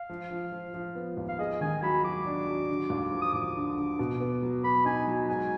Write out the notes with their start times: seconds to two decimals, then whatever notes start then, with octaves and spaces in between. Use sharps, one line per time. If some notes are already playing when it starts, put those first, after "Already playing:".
Already playing: F5
0.09 F3
0.31 F3
0.52 F3
0.74 F3
0.95 B3
1.17 D#2
1.28 F5
1.39 G#4 D#5
1.61 D#3 G#5
1.82 F#3 B5
2.04 F#3 D6
2.26 D4
2.48 F#3
2.69 D3
2.90 D#2
3.12 F3
3.22 D#6
3.34 D#2 D6
3.55 D3
3.77 D3
3.99 B2
4.20 B3
4.42 F#3
4.64 B3 B5
4.85 D#4 G#5
5.07 F#3
5.29 G#2 G#5